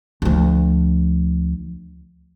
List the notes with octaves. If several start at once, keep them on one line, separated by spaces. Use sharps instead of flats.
D2 F3